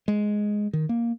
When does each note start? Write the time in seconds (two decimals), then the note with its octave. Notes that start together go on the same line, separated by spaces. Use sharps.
0.08 G#3
0.73 D#3
0.89 A#3